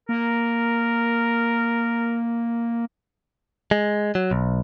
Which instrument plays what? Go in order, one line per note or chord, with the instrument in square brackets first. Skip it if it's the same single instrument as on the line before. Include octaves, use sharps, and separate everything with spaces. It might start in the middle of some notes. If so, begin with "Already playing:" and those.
[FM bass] A#3 [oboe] A#4
[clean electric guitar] G#3
F#3
B1